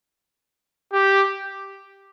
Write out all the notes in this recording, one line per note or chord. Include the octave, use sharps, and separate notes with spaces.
G4